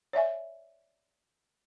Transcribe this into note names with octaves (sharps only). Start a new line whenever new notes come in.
C#5 D5 E5 G#5